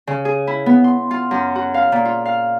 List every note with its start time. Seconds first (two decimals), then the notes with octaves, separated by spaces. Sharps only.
0.07 C#3
0.25 G#4
0.47 E4
0.66 B3
0.84 C6
1.11 F4
1.31 F#2
1.55 F#4
1.74 F5
1.92 A#2
2.05 F4
2.25 F5